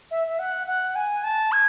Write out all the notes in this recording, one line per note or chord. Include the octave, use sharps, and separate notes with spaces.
E5
E5
F#5
F#5
G#5
A5
G#6